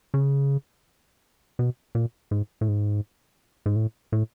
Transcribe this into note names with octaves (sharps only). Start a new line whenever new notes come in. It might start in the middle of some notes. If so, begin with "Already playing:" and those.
C#3
B2
A#2
G#2
A2
G#2
G#2
A2
A2